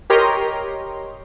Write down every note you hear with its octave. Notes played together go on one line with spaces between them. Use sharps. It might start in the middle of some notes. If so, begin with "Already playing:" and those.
G4 A#4 C#5 D#5 A#5 C6